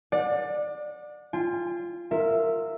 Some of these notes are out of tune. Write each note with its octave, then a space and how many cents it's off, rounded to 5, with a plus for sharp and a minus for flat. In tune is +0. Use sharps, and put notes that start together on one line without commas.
D5 +20 F#5 -30
F4 -15 G5 +40
F4 +15 A#4 -20 E5 +0